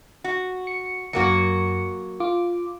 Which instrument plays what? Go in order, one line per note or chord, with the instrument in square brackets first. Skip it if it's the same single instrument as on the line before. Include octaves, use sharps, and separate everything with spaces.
[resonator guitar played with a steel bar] F#4
[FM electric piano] C#7
[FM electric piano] F#2 C#7 [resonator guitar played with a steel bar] F#3 A#3 F#4
[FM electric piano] F4 D6